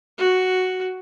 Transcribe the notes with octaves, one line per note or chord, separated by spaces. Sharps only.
F#4